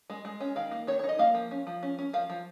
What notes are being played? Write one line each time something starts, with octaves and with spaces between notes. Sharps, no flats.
G#3
G#3
C#4
D#3 F5
A#3
D#3 C#5
C#5
D#4
D#5
A#3 F5
F3
C#4
F3
C#4
C#4
F3 F5
F3